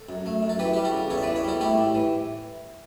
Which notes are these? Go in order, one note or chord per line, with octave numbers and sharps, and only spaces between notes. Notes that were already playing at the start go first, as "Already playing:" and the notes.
Already playing: A4
F#2
A3
F#2
A4
E3 G4 B4
G3 G4
F#4 A4
C#3
E2 A4 C#5
E5
E3 B4 D5
C#5 E5
G3 F#4 A4
A3 E4 G4
A2
E3